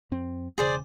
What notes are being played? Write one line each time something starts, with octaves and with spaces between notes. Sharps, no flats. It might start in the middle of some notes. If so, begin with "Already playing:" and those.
F2 C4
E1 C#3 G#4 C5 D5